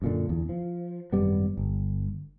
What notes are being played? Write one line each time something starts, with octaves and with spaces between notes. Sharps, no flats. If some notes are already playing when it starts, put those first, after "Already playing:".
F#2 A#2 D3
E2
F3
G#1 F#2 G3 B3
G1